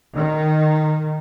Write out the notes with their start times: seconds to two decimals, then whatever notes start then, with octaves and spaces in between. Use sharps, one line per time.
0.17 D#3